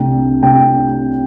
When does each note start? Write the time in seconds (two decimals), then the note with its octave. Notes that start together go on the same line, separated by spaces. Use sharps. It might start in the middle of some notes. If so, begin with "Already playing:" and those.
Already playing: C2 C3 A3 D4 G5
0.42 C2 C3 A3 D4 G5